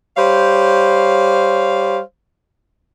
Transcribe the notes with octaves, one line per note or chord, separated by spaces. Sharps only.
G3 C5 C#5 F5